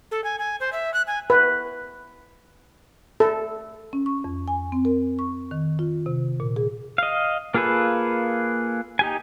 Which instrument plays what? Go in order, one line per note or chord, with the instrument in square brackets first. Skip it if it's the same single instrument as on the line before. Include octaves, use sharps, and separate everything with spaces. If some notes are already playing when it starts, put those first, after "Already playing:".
[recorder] A4
G#5
G#5
C5
E5
F#6
G#5
[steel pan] B4
A4
[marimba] C#4
C#6
F2
G#5
C4
A#4
C#6
D#3
F4
C3
A#2
G#4
[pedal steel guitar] D#5 F5
A#3 F4 G#4 A4 B4
D#4 G4 G#5